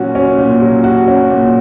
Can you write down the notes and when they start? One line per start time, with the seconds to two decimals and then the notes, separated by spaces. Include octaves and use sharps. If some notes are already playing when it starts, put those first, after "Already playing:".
Already playing: A#2 F#3 C#4 F#4
0.15 C#4
0.38 A#2
0.61 F#3
0.84 F#4
1.08 C#4
1.30 A#2